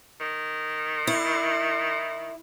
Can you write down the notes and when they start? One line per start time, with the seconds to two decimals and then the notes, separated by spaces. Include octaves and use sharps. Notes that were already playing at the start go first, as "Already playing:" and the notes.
0.21 D#3
1.07 E4